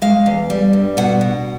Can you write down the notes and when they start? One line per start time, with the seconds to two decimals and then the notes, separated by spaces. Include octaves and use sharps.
0.02 G#3 F5
0.26 E2
0.50 G3
0.73 G2
0.97 B2 F#5
1.21 B2